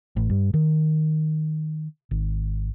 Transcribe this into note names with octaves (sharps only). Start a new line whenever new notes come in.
A1
G2
D#3
G#1